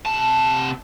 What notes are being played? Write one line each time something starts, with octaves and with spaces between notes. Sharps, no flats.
C3 A5